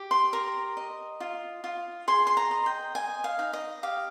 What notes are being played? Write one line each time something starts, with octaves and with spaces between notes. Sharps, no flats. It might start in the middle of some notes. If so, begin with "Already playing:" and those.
Already playing: G4
C6
A#4 A#5
D#5
F4
F4
G#4 C6
C6
A#5
D#5
G5
D#5 G#5
F5
D#4
D#5
G4 F5